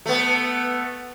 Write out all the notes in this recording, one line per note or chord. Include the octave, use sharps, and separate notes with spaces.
A3 B3